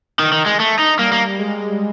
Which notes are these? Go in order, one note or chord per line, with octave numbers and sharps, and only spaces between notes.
D#3
D#3
G#3
A3
D#4
G3 A#3
A#3
G#3